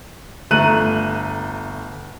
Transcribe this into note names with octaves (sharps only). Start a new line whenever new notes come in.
G1 A3 A#5 F#6 D#7 F#7